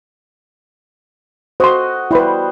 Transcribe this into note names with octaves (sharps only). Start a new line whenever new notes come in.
F#4 A4 C5 D#5 C6
G3 B3 E4 B4 C5